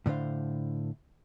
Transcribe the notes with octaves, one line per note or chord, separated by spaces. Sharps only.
A2 D3 D4 C5 F5